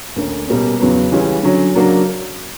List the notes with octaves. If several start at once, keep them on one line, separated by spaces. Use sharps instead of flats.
D2 D3 A#3 C#4
B2 G3 A#3 C#4
E2 C#3 F#3 B3
C#2 C#3 E3 G3 C#4
D3 F#3 C#4
C#3 F#3 A#3 D4 F#4